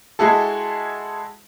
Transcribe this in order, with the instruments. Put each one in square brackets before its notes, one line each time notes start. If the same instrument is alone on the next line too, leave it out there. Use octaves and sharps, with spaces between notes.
[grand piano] G#3 E4 F#4 G#4 A4